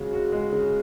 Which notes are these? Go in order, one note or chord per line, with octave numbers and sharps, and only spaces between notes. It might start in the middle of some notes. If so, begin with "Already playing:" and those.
Already playing: C#3 G#3 F#4
F#4
G#3
C#3